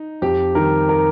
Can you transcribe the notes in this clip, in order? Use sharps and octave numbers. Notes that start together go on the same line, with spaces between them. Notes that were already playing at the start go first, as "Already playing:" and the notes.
Already playing: D#4
F2 G4
D#3 G3 A#4
A#4